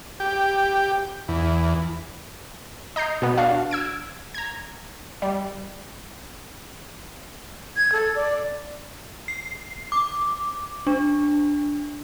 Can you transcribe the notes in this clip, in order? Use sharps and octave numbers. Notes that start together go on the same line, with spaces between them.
G4
E2
D#5 A#5 G6 C7
B2 B3
D4 F#4 F5
E6 G#6 D7
A#5 G#6
G3
G#6
A4
D5
C7
D6
D4